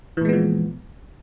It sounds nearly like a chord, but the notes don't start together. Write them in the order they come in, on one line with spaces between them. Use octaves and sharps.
E3 A#2 G#3 B3 F3